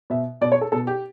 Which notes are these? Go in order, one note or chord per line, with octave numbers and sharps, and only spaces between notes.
B2 E5
B2 D5
C#5
A4
B2 A4
G4